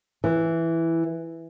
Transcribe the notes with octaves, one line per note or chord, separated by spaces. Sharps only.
E3